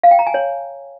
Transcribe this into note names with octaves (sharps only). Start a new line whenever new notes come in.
F5
G5
A#5
G#5
C#5